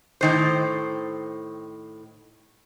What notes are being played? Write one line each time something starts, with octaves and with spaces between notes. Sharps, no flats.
A2 D#3 C5